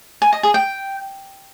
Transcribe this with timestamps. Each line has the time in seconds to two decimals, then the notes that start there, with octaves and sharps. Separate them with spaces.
0.22 G#5
0.33 D#5
0.43 G#4
0.54 G5